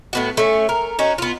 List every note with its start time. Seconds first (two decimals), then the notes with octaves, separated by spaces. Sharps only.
0.13 A2 B3 F#4
0.37 A3 C#4
0.69 A#4
0.99 C#4 D#4 F#4
1.18 B3 F4